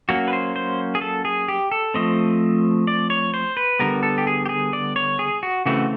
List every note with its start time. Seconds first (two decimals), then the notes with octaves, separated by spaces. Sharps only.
0.09 F#3 A#3 C#4 F#4
0.28 B4
0.33 C5
0.56 C5
0.95 G#4
1.01 A4
1.25 G#4
1.48 G4
1.72 A4
1.94 F3 A3 C4 D#5
2.87 D5
3.10 C#5
3.34 C5
3.57 B4
3.79 D3 G3 B3 A#4
4.03 A4
4.18 G4
4.27 G#4
4.46 G4
4.49 G#4
4.73 D5
4.96 C#5
5.19 G#4
5.43 F#4
5.66 C#3 E3 A3 C4 F#4